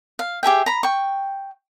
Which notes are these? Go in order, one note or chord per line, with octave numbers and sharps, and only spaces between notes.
F5
G4 G#4 E5 G5
A#5 B5
G5 C#6